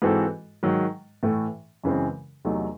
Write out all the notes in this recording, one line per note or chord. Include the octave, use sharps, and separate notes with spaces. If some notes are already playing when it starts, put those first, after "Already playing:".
G#2 E3 C4 F#4 A4
G#2 D#3 F#3
A2 E3 A3
F#2 C#3 E3 G#3 C4
E2 C3 F#3 A3 D#4